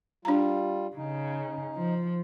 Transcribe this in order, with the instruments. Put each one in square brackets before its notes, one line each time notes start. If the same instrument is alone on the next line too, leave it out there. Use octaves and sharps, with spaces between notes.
[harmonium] G3 F4 [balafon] D4 A#5
[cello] C#3 [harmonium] D#4
[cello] F3